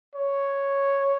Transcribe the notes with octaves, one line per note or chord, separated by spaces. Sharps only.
C#5